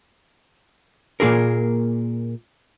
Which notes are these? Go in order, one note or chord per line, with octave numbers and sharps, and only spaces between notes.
A#2 A#3 F#4 G#4 A#4